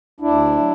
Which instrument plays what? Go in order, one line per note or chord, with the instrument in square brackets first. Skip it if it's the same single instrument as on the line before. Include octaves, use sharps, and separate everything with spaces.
[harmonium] D2 D4 E4
F#3